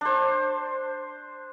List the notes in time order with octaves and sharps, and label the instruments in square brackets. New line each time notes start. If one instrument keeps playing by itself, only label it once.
[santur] D4 C5